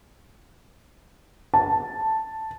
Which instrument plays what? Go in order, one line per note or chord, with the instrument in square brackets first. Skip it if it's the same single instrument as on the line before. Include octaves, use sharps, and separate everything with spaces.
[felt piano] A5